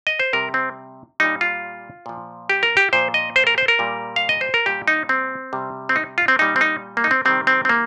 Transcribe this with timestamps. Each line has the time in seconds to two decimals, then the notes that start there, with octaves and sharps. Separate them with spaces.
0.07 D#5
0.20 C5
0.33 C3 G3 A#4
0.54 C4
1.20 A#2 G3 D#4
1.41 F4
2.06 A#2 F3
2.49 G4
2.63 A#4
2.77 G4
2.93 A#2 F3 C5
3.14 D#5
3.36 C5
3.47 A#4
3.58 C5
3.68 A#4
3.79 A#2 G3
4.16 F5
4.29 D#5
4.41 C5
4.54 A#4
4.66 A#2 G3 G4
4.88 D#4
5.09 C4
5.53 C3 G3
5.89 C4
5.96 D#4
6.18 F4
6.28 C4
6.39 A#2 G3 D#4
6.56 C4
6.61 D#4
6.97 A#3
7.04 D#4
7.11 C4
7.25 C3 D#3 G3 C4
7.47 C4
7.65 C4
7.69 A#3